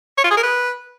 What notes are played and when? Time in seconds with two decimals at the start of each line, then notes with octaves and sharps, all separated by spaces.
0.18 C#5
0.24 F4
0.31 G#4
0.37 A#4
0.43 B4